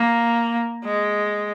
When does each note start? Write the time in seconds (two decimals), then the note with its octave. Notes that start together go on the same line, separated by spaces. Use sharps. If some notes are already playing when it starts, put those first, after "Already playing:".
Already playing: A#3
0.85 G#3